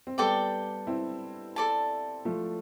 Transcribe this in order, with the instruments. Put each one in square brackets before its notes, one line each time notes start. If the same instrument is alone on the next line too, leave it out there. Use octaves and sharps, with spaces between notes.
[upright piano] C4
[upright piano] G3 B3 [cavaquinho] A4 D5 G5 D6
[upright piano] C4 E4
[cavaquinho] A4 D5 A5
[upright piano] F3 A3